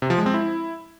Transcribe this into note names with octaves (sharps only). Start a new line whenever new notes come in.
C3
F3
G#3
C4
E4